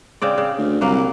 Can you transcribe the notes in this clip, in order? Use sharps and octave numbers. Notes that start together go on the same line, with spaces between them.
C#3 C4 D5
C#3
D2
C2 F#3 A#3